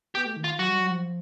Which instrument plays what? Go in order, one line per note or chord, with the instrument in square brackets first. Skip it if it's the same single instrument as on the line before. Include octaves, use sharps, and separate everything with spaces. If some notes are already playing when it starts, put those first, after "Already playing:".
[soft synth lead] B3 [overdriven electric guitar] G4
[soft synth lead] A3
D#3
[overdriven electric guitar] F4
[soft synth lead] F#3 [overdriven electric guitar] F#4
[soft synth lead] G3
F#3
F3